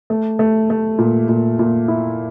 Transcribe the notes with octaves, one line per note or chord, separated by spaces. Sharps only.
A3
A3
A3
A#2
A#2
A#2
E4